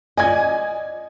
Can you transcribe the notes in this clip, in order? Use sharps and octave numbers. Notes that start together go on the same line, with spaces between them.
D5 D#5 G#5 G#6